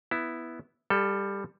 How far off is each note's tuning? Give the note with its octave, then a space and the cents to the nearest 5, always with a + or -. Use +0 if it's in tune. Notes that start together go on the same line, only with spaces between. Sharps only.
B3 +0 E4 +0
G3 +15 A4 +0